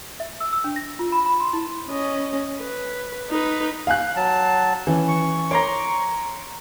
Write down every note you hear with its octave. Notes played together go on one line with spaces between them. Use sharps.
E5
E6
E6
D4
A#6
F4
B5
B5
C6
E4
C#4 D#5
B4
D#4 B4
F5 G#5 F#6
F#3 A5
E3 C#4
C#6
C#5 A#5 C6 D6